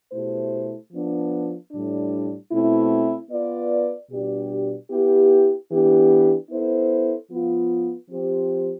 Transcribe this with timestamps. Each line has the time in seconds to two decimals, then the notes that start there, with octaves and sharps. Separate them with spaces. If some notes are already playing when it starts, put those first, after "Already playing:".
0.12 B2 A3 E4 G4 C5
0.92 F3 B3 D4
1.71 A2 G3 D4
2.51 B2 A3 C4 E4
3.30 B3 F4 B4 D5
4.11 B2 G3 D4 G4 D5
4.90 B3 E4 G4
5.71 E3 B3 D4 G4
6.50 B3 E4 A4 C5
7.29 F3 B3 F4
8.09 F3 C4 G4 C5